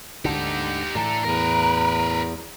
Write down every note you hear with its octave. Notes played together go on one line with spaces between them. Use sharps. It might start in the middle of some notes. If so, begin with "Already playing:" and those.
D2 G#2 D3 D#4 G4
A2 E3 D4 A4 A#5
E2 A#4 B4